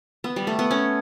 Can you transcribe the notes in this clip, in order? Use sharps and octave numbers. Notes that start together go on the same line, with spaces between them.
B3
G3
A3
B3
C#4